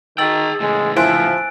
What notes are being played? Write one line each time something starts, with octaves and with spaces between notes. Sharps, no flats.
D#3 G#4 G5 E6 A6 F#7
A2 C#3 G#3
F3 E4 C5 G#5 F#6 D7